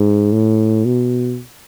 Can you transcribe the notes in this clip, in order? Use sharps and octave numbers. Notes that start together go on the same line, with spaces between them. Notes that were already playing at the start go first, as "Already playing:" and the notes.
Already playing: G#2
A2
B2